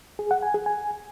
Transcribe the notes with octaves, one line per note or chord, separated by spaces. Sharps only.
G#4
F#5
G#5
G#4
G#5